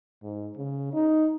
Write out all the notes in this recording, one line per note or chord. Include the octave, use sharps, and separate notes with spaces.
G#2
C#3
D#4